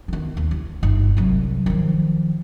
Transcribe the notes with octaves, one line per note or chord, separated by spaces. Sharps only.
D#3 B3
D#2
E4
G1 D#4
C2 F#3
D#3 F3